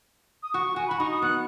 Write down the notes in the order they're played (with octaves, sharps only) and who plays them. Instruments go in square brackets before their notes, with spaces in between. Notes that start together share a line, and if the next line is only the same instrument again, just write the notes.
[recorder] D#6
[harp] F#4 [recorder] C#6
[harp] F#4 [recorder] G#5
[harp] F#4 [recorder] B5
[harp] D#4 [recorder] C#6
[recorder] D#6
[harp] B3 [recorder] F#6